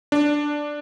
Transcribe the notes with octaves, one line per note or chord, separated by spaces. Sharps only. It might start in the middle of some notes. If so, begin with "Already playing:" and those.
D4